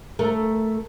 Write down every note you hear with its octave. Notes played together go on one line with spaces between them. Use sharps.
A3 A4 A#4